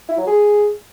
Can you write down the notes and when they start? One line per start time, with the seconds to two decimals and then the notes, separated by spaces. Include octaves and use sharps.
0.08 E4
0.18 F#3
0.27 G#4